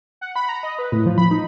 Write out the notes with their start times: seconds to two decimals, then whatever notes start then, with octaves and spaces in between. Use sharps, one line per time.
0.21 F#5
0.36 B5
0.49 A#5
0.63 D#5
0.79 B4
0.92 A2
1.06 F3
1.18 B5
1.31 D#4